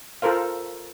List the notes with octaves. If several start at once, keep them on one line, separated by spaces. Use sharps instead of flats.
F4 A4 A#4 C5 F5